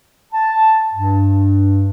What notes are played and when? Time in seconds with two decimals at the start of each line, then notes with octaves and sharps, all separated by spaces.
0.33 A5
0.93 G2